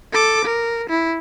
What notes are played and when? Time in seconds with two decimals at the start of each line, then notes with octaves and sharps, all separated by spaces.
0.13 A4 D6
0.45 A#4
0.90 E4